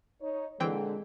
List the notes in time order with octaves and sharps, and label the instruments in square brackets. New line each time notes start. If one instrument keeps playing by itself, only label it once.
[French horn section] D#4 C#5
[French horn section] A#2 D3 [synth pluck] E3 C4 G5 [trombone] G#3